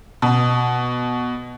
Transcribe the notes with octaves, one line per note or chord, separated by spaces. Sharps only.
B2